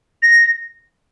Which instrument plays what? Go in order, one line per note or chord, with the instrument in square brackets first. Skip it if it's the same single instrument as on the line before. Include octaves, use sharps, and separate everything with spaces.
[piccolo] A#6